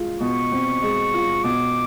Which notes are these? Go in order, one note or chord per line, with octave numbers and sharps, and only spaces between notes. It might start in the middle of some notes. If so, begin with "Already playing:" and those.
Already playing: G#3 F4
B2 C#6
C4
G#3
F4
B2 D6